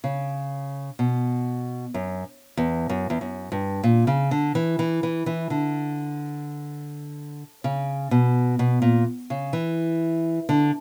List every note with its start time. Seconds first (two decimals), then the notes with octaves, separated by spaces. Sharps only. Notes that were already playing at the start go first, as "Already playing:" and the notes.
0.04 C#3
0.99 B2
1.94 F#2
2.57 E2
2.89 F#2
3.10 E2
3.21 F#2
3.52 G2
3.83 A#2
4.07 C#3
4.31 D3
4.55 E3
4.79 E3
5.03 E3
5.26 E3
5.50 D3
7.64 C#3
8.11 B2
8.59 B2
8.82 A#2
9.30 C#3
9.53 E3
10.49 D3